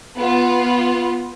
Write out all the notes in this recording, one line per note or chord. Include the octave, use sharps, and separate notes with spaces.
B3 F4